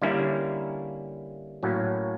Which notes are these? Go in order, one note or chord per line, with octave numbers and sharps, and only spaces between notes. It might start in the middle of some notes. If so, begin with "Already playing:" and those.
D3 G3 A#3 C#4 E4
A2 F#3 A#3 C#4